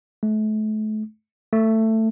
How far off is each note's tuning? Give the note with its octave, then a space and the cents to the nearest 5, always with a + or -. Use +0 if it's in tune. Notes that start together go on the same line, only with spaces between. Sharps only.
A3 -35
A3 +15